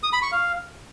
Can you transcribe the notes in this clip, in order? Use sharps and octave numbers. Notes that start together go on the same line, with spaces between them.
D#6
B5
C#6
F5